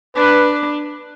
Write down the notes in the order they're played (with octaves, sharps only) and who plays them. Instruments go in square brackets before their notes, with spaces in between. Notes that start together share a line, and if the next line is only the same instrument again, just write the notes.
[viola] D4 [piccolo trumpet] B4